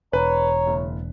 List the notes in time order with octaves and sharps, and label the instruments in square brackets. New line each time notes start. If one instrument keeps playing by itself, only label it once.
[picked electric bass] E1 [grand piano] B4 [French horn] C#5 [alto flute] A#5
[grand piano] F#1